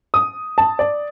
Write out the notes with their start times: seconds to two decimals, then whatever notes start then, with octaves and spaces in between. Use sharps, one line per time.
0.14 D#6
0.58 A5
0.79 D5